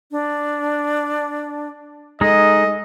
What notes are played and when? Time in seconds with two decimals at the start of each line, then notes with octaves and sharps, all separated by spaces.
0.11 D4
2.21 G#3 D#4 A4 D#5